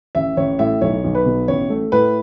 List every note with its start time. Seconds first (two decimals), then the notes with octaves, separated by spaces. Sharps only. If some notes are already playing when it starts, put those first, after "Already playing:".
0.15 A1 E5
0.37 A1 C#5
0.59 A2 E5
0.81 B1 C#5
1.04 B1
1.15 B4
1.26 B2
1.48 A1 C#5
1.70 A3
1.92 A2 B4